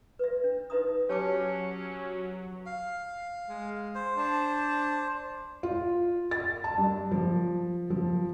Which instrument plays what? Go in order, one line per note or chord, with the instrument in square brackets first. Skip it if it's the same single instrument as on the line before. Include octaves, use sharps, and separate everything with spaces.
[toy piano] B4 E5
D4
D#4 B4 E5 A#5 D#6
[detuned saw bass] F#3 [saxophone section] C#4 [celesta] G4 B4 [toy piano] C#5 A5 D6
[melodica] F5
[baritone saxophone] G#3
[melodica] C5
[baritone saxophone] D4
[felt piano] F4
A6
A5
G2
F3
F3